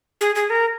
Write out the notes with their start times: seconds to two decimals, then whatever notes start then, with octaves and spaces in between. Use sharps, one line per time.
0.21 G#4
0.35 G#4
0.50 A#4